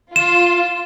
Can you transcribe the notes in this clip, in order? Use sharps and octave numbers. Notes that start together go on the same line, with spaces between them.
F4 E7